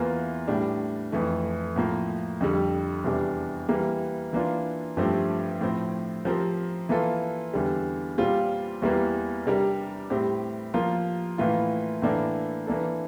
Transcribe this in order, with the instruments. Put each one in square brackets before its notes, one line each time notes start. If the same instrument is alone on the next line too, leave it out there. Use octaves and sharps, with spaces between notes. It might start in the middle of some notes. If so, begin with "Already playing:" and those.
Already playing: [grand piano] E2 E3 A#3 F4
A2 G3 D4
F2 E3 A3
A2 F3 A#3
F2 D3 G3
E2 C3 G3 D4
E3 G3 A#3
E3 A#3 D4 F4
G2 F3 A3 C4 G4
A2 F3 C4
F3 C4 G4 A#4
E3 A#3 F4 A4
E2 D3 G3
A#2 G3 C4 F4
E2 E3 G3 A#3
C3 G3 D4 G4 A#4
A2 G3 C4 G4
F3 A#3 F4 A#4
A2 E3 A#3 F4
A2 E3 A#3 D4 A4
E3 A#3 D4 A4